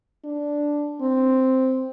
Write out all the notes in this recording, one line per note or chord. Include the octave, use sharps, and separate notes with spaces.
D4
C4